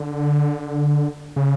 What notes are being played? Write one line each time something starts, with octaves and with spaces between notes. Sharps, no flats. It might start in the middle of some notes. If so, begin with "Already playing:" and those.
Already playing: D3
C#3